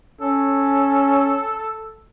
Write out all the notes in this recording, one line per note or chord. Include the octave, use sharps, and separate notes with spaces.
C#4 A4